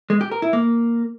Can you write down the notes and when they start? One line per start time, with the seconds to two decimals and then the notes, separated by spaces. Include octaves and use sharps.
0.10 G#3
0.21 G4
0.31 A#4
0.42 E4
0.53 A#3